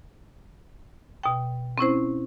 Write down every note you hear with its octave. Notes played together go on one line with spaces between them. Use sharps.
B2 G5
C4 C#4 E4 C5